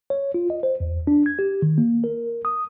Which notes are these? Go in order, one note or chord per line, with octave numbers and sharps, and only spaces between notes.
C#5
F4
D#5
C5
E2
D4
G#6
G4
D#3
A#3
A#4
D#6